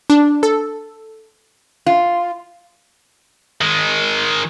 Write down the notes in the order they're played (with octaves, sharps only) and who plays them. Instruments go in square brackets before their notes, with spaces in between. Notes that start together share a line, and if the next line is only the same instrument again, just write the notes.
[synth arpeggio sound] D4
A4
[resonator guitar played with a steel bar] F4
[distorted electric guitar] D#3 G#3